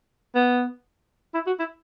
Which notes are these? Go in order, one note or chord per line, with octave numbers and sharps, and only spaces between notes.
B3
E4
F#4
E4